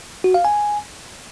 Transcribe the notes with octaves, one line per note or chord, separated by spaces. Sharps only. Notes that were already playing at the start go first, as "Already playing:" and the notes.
F#4
F5
G#5